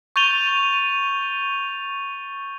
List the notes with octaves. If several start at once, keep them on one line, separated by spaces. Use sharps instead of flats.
C#6 G6 A6 D#7 F7 G7